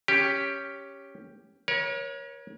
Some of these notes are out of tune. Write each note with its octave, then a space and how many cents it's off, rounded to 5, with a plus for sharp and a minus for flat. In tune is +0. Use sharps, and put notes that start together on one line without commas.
C#4 +0 G4 +5
A#4 +45 C#5 +0